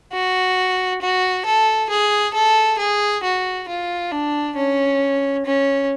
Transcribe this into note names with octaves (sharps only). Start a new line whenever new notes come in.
F#4
F#4
A4
G#4
A4
G#4
F#4
F4
D4
C#4
C#4